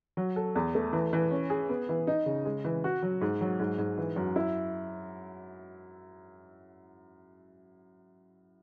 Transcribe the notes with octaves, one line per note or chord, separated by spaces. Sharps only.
F#3
A4
E2
A3
E3
E3
C#4
G#4
B3
E3
D#4
C#3
G#3
E3
F#4
F#3
G#2
F#3
G#2
G#2
E3
F#2
E4